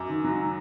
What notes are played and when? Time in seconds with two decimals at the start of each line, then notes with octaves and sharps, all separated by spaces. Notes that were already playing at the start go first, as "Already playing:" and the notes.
Already playing: F#2 D6
0.09 D#3
0.24 F#3